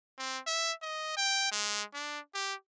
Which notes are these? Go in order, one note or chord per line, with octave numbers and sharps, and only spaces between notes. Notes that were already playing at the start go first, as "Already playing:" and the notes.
C4
E5
D#5
G5
G#3
D4
G4